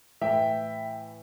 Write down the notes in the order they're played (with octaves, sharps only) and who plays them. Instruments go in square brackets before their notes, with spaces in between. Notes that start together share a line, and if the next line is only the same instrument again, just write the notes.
[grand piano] A2 E3 E5 G5